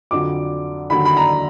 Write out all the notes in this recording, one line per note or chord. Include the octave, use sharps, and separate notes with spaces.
F2 D3 F#3 D6
D#2 D3 F#3 B5
B5
A#5